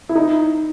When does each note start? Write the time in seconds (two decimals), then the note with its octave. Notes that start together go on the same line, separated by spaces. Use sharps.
0.09 E4
0.15 D#4